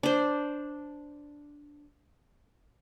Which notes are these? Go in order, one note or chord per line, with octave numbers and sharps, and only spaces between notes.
D4 C5